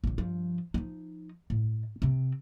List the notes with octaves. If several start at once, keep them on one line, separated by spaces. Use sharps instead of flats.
A#1 D3
G2 F3
F3 D#4
A2
C3 C4